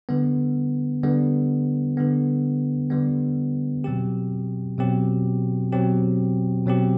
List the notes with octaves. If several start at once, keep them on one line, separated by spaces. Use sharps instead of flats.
D3 G3 B3
D3 G3 B3
D3 G3 B3
D3 G3 B3
B2 F#3 C4 G4
B2 F#3 C4 G4
B2 F#3 C4 G4
B2 F#3 C4 G4